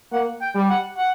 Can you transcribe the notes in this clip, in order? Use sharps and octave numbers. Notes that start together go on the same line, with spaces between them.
A#3 F#5
G5
G3
F#5
F#5